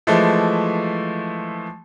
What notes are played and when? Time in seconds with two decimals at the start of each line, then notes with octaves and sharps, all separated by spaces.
0.07 E3 F3 G#3 A3